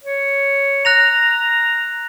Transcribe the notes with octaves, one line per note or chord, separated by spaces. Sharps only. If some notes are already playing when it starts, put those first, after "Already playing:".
C#5
A#5 F#6 A#6 F7